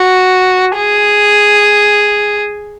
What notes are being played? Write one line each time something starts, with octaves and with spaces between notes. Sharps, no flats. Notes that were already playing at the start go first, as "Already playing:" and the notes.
Already playing: F#4
G#4